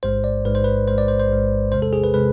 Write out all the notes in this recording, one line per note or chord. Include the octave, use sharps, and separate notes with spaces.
A1 G#2 G#3 C5
D5
A1 G#2 G#3 B4
C5
B4
A1 G#2 G#3 C5
D5
C5
C5
A1 G#2 G#3
E2 C3 G#3 C5
A4
G#4
B4
C3 G#3 B4